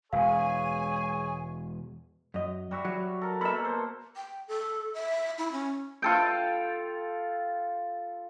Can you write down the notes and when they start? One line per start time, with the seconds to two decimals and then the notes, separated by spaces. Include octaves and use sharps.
0.13 E1 G#3 G#4 C#5 F5 G#5
2.34 F#2 D#5
2.71 G3 F#4 E5
2.85 F#3
3.21 A4 A#4
3.41 B2 A#3 A4 E5 B5
3.65 C5
4.17 G5
4.48 A4
4.94 E5
5.38 E4
5.52 C#4
6.02 F4 A4 G5